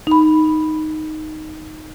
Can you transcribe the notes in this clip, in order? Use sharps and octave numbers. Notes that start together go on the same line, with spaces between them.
D#4 B5